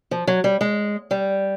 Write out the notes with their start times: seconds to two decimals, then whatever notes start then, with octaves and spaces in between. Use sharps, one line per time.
0.11 F3
0.27 F#3
0.44 G3
0.61 G#3
1.11 G3